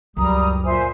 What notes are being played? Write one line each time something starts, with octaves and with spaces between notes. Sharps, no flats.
C#2 F#2 G3 A#5 D#6
A#2 C5 E5 G#5